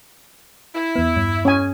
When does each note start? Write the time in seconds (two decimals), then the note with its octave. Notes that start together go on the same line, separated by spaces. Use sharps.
0.74 E4
0.96 E2 B3
1.16 G2
1.45 C#4 G#5